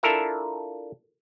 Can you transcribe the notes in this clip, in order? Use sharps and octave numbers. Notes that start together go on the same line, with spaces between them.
D4 E4 F4 A4 A#4 E5